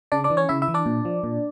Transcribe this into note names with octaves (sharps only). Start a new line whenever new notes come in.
C#3 D4 D5
D4 D5
E3
C#4 C#5
C#3 E4 E5
E4 E5
E3
D4 D5
A#2
F3
A#2